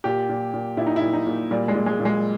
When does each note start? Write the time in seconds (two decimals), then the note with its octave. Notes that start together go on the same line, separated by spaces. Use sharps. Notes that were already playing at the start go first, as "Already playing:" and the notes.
0.04 A#2 G4
0.29 A#2
0.54 A#2
0.77 A#2 E4
0.87 D#4
0.96 E4
1.01 A#2
1.13 D#4
1.27 A#2
1.51 A#2 G3
1.68 G#3
1.75 A#2
1.86 G#3
2.00 A#2
2.05 G#3